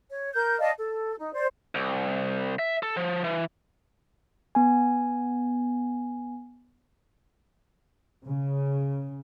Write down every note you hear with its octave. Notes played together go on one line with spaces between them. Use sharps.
C#5
A#4 G6
D5 D#5 F5 A5
A4
D#4
C5 D5
C2
E5
A4
F3
E3
B3 G#5
C#3